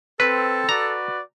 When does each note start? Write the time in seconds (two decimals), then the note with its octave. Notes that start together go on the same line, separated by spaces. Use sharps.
0.20 C4 A4 B4
0.69 F#4 B4 D5 A#5